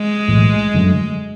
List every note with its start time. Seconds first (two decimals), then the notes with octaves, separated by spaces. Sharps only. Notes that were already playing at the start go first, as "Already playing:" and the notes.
Already playing: G#3
0.28 B1 A2 E3 A3
0.74 F#2 D3 F#3 A3